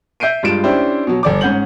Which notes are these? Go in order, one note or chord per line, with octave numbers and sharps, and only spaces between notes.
E5 G6 C7 D7 D#7
G2 G#3 F4 D7 E7
C#4 D4 E4 G4 C5
B2 F#3
G1 D5 D6
G#2 C#4 F#5 G6 F#7